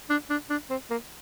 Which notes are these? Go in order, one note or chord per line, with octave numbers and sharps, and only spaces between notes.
D4
D4
D4
C4
A#3